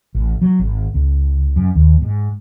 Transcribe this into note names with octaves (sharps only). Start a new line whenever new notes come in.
A1
F#3
G#1
C#2
F#2
D#2
G#2